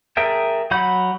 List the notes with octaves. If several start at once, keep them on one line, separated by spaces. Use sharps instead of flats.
G#4 A#4 E5 G5 A5
F#3 F#5 B5 G6